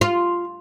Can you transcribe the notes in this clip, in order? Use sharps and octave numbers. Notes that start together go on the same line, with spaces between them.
F4